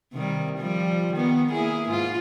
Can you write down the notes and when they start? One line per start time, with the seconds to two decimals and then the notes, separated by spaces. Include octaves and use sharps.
0.13 C3 D#3 G3
0.58 F3 G3
1.13 D#3 B3
1.51 A#3 E4 G#4
1.89 G#2 F4